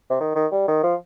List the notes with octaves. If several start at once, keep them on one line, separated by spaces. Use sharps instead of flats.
C3
D#3
D#3
G3
D#3
F3